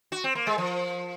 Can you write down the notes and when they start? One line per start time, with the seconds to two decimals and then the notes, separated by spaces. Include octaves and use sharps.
0.12 F#4
0.24 C4
0.35 A#3
0.47 G#3
0.58 F3